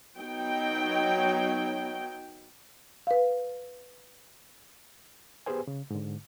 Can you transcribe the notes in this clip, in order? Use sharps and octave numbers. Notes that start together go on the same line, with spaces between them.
F#3 B3 D#4 G5
B4 F5
B3 G4 G#4 B4 C5 G#5
C#3
G#2 D3